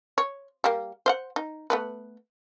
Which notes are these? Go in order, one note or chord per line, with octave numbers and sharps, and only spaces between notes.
C#5
G3 A#3
C5 F5 F#5
D#4
A3 B3 B4